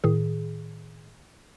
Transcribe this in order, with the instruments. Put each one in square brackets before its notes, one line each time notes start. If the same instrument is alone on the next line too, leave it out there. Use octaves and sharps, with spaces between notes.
[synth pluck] A2 D#3 G#4